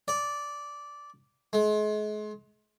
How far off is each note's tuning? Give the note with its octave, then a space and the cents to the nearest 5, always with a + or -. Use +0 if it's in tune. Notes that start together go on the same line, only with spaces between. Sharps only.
D5 -10
G#3 +35